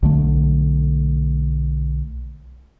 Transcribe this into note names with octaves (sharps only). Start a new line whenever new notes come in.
B1 D3 A3